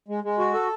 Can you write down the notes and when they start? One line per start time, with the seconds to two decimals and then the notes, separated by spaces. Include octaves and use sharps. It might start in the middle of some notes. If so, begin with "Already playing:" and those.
0.08 G#3
0.24 G#3
0.39 F#4
0.54 A4